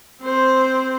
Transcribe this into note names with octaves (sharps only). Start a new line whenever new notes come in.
C4 C5